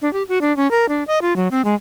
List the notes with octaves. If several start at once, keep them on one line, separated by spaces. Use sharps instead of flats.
D4
G4
F#4
D4
C#4
A#4
D4
D#5
F4
F#3
C4
G#3